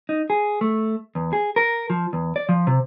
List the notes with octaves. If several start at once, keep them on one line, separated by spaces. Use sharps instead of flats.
D#4
G#4
A3
E2
G#4
A#4
F3
E2
D5
F3
C3